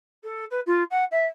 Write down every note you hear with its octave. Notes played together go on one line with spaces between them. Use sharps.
A4
B4
F4
F#5
E5